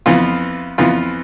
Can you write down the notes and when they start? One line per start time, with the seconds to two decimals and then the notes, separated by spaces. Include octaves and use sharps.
0.06 F2 E3 B3 F4
0.78 F2 E3 B3 F4